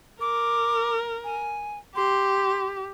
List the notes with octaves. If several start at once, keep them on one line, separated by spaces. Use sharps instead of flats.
A#4 D6
G#5
G4 C6